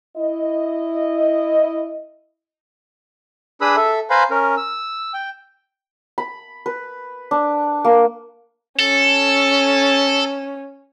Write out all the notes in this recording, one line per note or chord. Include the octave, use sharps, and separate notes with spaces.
E4 D#5
D4 G#4 B4 B5 D#6 E6
A4 E5
B4 C5 F5 G#5 A#5 B5
C#4 A#4
E6
G5
B5
B4
D4
A#3
C#4 A4